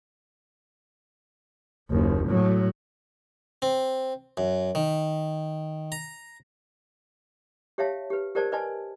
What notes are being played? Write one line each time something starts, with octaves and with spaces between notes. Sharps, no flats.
F#1 D#2
A2 F#3
C4
F#2
D#3
A#5
G4 C#5 E5 F5 A5
G4 B4
G4 A#4 C5 D5 A5
B4 D5 D#5 G#5 A5 C6